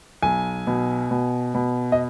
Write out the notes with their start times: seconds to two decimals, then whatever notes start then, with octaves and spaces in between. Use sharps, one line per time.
0.22 B1 G#5
0.67 B2
1.11 B2
1.55 B2
1.92 D#5